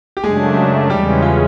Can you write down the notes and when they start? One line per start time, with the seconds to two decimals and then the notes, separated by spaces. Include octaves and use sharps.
0.17 G4
0.24 F#2 C#3 F#3 G#3 A3 D4 G#4
0.90 E2 C#3 E3 G3 G#3 C#4 G4
1.22 F4